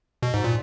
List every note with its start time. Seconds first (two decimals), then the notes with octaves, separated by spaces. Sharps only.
0.23 B2
0.34 G#2
0.44 A#2